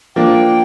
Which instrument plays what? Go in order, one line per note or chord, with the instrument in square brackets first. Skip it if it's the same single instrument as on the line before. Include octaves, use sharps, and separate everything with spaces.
[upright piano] F3 A#3 D4 [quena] G5